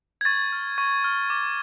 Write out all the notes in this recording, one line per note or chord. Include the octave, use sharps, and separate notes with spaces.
G#6
C#6 A6
F6
C#6 G#6
F6
D6